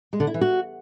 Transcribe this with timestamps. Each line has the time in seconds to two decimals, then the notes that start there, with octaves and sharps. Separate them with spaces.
0.13 G#3
0.20 D3
0.27 E4
0.34 E3
0.41 F#4